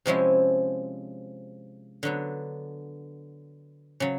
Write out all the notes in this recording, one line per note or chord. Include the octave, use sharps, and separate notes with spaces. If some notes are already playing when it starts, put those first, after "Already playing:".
C3 F3 G#3 C#4 E4
D3 F#3 B3
C#3 F#3